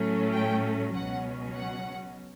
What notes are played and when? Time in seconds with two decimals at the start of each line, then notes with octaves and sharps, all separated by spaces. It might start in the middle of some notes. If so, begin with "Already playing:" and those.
Already playing: A2 F#3 A3 C#4
0.33 G5
0.93 C#2 B2 F#3 C#4 F#5
1.54 F#5